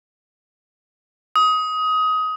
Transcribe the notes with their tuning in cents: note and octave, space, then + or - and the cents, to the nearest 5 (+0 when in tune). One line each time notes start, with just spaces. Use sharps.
D#6 +20